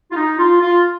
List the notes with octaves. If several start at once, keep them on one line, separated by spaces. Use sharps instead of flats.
F4
D#4
F4
F4